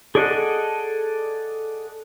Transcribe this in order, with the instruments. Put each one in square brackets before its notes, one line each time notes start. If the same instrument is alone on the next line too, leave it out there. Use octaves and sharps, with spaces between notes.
[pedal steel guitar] G#4 A4 D5 D#5 F#5